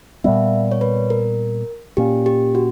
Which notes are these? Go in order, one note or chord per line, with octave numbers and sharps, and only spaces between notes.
A#2 G3 B3 E5
C#5
B4
A#4
A#2 A#3 C#4 G4
G4
F#4